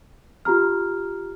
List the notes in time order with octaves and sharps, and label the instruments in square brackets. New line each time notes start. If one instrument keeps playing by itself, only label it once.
[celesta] F4 G4 A#5 F6